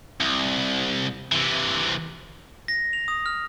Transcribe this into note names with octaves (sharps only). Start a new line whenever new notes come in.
C2
C3 E3
A#6
F7
D#6
F6